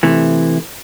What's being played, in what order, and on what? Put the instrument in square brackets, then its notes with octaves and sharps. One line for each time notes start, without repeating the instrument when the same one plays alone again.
[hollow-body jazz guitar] C3 E3 A3